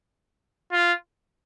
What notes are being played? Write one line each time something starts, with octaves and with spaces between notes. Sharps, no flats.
F4